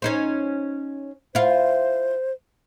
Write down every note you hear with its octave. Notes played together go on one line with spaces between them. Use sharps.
C#4 D#4 C5
E4 F4 C5